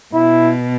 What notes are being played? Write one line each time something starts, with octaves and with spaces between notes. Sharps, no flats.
B2 E4